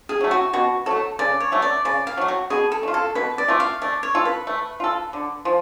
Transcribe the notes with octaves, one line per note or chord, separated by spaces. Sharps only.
G#4
F#3 A3
F#4
B2 F#4
F#3 A3 A4
C#3 D5
C#5
F#3 A3
D5
C#3 D5
F5
F#3 A3
F#4
B2 G#4
A4
A3 F4
A4
B2 B4
D5
A3 F4
F5
A3 D5
C#5
F4 A4
B4
A3
F4 A4
D3
F3